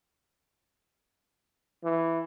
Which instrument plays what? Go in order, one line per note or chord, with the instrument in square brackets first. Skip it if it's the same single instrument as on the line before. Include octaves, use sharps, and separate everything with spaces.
[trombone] E3